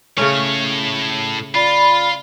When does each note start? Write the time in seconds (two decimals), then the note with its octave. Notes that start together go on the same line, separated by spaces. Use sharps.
0.17 A2 C#3 A3 C#4 C#5
1.55 F4 D5 B5